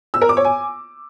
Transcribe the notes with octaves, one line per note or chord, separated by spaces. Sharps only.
E6
A#4
D6
C#5
G#5